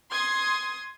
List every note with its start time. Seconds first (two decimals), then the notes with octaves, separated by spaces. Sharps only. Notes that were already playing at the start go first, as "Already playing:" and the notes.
0.11 C6 D#6 G#6